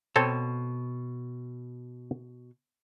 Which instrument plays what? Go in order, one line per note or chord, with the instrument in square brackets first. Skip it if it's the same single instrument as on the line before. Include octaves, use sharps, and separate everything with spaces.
[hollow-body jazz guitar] B2 [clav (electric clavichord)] C4 A4 C#5